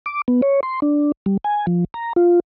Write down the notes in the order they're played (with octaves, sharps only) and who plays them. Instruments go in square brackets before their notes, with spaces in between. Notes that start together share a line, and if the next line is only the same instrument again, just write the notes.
[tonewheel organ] D6
B3
C#5
C6
D4
G3
G#5
F3
A#5
F4